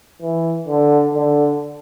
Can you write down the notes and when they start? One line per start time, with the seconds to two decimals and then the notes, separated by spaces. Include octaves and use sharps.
0.22 E3
0.68 D3
1.14 D3